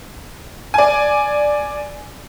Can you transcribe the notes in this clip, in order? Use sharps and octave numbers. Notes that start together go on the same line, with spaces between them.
D5 G#5